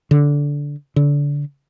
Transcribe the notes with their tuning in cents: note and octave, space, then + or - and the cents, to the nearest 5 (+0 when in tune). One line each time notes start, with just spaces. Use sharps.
D3 -15
D3 -25